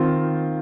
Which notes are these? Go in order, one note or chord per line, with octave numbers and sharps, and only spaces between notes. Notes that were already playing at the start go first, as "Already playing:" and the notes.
Already playing: D#3 C4 F4